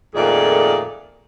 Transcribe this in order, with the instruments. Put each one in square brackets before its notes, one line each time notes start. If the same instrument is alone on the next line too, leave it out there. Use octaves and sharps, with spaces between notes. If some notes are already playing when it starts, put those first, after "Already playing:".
[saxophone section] F2 A#2 D#3 A3 G#4 D5